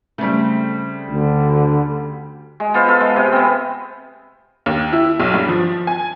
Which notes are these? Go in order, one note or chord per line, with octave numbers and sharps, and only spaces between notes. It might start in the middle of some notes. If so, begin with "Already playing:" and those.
C#3 G3 A3 C4
D2 D3
G#3
B3 F4 C5
F4 A4
G#3
C3
B3 C4
D#2
E4
B1
G2
F3
G#5